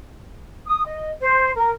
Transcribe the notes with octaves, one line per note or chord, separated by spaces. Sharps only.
D#6
D#5
C5
A#4